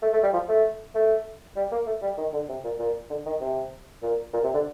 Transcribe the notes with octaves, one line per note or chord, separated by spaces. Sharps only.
A3
A3
G3
F3
A3
A3
G3
A#3
A3
G3
D#3
D3
C3
A#2
A#2
D3
D#3
C3
A#2
A#2
C3
D3